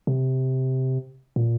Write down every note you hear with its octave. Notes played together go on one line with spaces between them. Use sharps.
C3
A#2